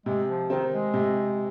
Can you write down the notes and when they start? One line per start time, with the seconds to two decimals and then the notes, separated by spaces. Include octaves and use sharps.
0.06 C3 G#3
0.28 F3
0.50 D#3 C4
0.72 G#3
0.94 C3